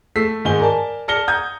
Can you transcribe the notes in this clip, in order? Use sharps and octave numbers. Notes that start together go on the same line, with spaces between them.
A3 E6 B6 C7
G#2 D#3 G#5 G7
A#4 D5 G#5 A5
D5 A5 F6 A#6 C#7 G7
A#5 D#6 G6 G#6